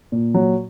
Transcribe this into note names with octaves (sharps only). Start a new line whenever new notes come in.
A#2
F#3